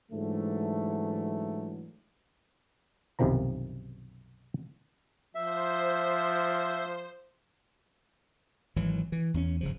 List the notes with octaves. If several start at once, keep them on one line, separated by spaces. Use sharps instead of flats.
G#2 D3 E3 F#3 A3
B1 F#2 C3 D#3 F3 A#5
F3 C5 E5
G#1 E3 F#3
E3
E2 C4 C#4
G1 C#3 F3